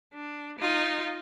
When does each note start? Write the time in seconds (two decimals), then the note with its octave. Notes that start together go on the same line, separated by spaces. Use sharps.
0.14 D4
0.59 D#4 F4